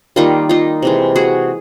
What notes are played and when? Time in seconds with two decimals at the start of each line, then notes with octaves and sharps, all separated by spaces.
0.16 D#3 G3 A#3 D#4 F4
0.49 D#4 F4
0.82 C3 E3 G#3
1.16 F#4 G#4